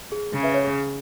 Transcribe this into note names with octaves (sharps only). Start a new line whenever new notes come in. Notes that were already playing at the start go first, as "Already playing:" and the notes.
G#4
C#3
B4 E5
C#5
G#4